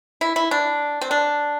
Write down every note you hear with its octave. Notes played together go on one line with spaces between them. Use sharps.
E4
E4
D4
C4
D4